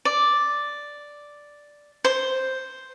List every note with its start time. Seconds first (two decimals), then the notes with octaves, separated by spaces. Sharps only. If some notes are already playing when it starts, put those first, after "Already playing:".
0.05 D5
2.05 C5